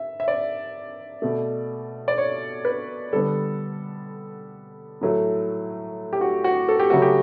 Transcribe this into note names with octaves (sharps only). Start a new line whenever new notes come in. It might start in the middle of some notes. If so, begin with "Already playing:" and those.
Already playing: E5
E5
D5
B2 A3
D5
C#5
B4
D3 G3 B3 A4
A2 F#3 A3
G4
F#4
F#4
A4
G4
C#3 F#3 A3 F#4
G4